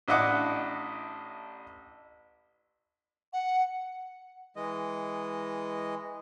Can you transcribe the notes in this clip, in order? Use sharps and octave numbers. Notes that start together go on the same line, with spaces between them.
A1 D4 E4 D#5 F#5 D6
F#5
E3 G#3 D#5